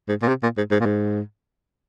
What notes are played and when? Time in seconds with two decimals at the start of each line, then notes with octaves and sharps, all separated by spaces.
0.08 G#2
0.22 A#2
0.28 C3
0.43 A#2
0.57 G#2
0.71 G#2
0.80 A#2
0.86 G#2